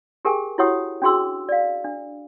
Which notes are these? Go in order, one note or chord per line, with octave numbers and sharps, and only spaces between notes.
G4 G#4 A#4 G5 G#5
E4 F#4 G4 C#5 F#5 D#6
C#4 D4 F#4 G#4 C6 E6
D5 F5
D4